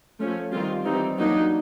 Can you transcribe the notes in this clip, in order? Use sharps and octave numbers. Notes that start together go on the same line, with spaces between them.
F3 A3 C#4
D#3 G3 C4 F4
E3 G3 C4 D#4
F#3 A#3 D4 D#4